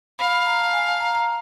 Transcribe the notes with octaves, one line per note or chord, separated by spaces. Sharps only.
F5 B5
B5
A#5
A5
G#5
A5
A#5
A#5